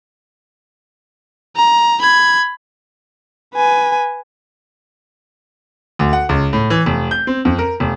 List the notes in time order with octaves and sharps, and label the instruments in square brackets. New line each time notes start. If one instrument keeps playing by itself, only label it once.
[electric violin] A#5
B5 G#6
B4 G#5
[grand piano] D2
F#5
C#2
A2
E3
F1
G6
C4
F2
A#4
F1